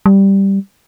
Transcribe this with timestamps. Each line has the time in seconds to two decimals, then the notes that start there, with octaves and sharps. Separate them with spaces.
0.06 G3